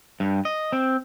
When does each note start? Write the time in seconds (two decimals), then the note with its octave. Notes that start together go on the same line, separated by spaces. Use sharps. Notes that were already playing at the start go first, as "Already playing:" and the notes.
0.20 G2
0.45 D#5
0.72 C4